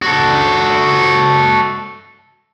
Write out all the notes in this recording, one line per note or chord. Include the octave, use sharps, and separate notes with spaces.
F#4 A4